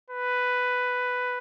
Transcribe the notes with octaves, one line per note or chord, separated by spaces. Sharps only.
B4